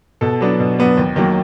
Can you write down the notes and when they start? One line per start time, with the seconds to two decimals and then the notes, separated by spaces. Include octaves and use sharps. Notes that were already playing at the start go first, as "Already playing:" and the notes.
0.21 B2 A4
0.40 F#3 B3 D4
0.60 B2
0.78 F#3 B3 D4
0.97 D#2
1.16 D#3 F#3 A#3